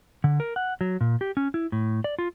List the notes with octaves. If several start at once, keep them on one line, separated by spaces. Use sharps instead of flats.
D3
A#4
F#5
F#3
A#2
G4
C#4
E4
A2
D5
F4